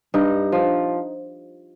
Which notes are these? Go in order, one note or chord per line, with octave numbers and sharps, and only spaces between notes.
G2 D#4
F3